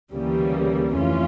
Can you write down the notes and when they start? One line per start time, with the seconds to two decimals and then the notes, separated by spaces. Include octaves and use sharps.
0.13 D2 C#3 E3 G3 A#3
0.94 F2 E3 A3 C#4 F4